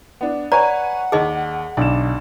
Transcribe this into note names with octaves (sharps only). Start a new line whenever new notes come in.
B3 D4
B4 C#5 D5 F#5 G#5 A#5
D#2 G#4 D#5 A5
B1 D3 D5 E7